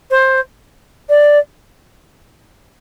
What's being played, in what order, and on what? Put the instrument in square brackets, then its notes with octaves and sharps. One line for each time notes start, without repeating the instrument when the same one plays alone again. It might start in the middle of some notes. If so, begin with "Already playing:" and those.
[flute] C5
D5